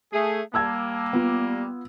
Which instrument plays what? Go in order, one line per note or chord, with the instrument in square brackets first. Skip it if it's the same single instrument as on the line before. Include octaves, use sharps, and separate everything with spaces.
[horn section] A3 G#4
[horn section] G3 A#3 [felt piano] A5 E6 G#6
[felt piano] B3 F4